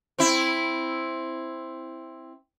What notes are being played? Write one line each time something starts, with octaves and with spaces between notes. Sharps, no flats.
C4 E4